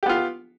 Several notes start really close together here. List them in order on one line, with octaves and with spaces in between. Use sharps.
G4 B3 F4